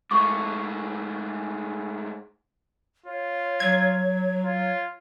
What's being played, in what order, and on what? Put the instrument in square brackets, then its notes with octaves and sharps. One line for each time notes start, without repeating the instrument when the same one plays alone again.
[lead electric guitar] G#2 A3 [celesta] C#6 D6
[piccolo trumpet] F4 [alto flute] C#5
[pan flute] F#3 [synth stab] G#6
[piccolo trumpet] F4